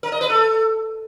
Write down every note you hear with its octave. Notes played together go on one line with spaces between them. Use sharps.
A#4
D#5
B4
A4